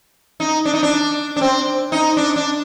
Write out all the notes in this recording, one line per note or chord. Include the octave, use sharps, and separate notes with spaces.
D#4
D4
D#4
D4
D4
C4
D#4
D4
D4